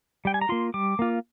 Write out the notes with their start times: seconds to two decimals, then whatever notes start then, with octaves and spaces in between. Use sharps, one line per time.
0.25 G3 G5
0.34 G#5
0.41 A#5
0.49 A#3 F4 C6
0.74 G3 D6
0.99 A#3 F4